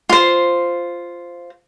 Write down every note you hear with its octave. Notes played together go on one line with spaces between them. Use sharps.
F4 C5